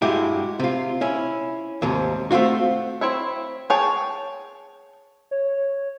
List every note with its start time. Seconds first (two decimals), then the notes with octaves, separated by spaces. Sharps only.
0.02 G2 G#3 E4 F#4 G4
0.59 C3 F4
1.01 C#4 E4
1.82 D#2 G#2 C3
2.31 A3 C4 D4 F4 F#4
3.01 C4 E4 C#5 E5
3.70 G#4 C#5 G5 A5
5.31 C#5